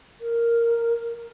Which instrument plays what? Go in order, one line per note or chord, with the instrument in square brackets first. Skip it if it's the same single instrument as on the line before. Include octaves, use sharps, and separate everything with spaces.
[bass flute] A#4